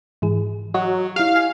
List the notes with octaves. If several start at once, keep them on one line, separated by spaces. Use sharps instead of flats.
G#2 E3 G#4
F#3 D#5
E4 G4 F5
G#5 C7